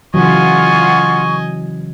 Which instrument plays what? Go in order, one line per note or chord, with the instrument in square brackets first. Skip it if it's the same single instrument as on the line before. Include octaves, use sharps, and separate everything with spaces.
[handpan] C#3 E3 F#3 [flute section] F4 F#5 [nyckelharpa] D#5 G#5 [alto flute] C#6